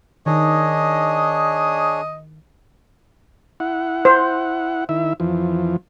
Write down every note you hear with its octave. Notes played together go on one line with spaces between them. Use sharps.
D#3 D4 G#4 C#5 D#5
E4 F#5
C5
D#3 E4 E5
F2 E3 F3